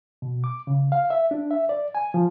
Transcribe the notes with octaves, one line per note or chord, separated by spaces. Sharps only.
B2
D6
C#3
F5
E5
D4
E5
D5
G#5
F3